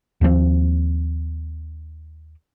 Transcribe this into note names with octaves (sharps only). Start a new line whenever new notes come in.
D#2 F3 A#3 C4